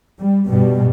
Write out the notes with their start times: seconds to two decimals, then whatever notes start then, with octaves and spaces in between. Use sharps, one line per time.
0.19 G3
0.48 G2 B2 G3